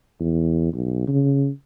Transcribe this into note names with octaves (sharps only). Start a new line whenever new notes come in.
E2
B1
C#3